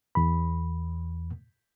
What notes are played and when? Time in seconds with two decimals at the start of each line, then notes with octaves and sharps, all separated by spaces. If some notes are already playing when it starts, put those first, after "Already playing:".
0.15 E2 B5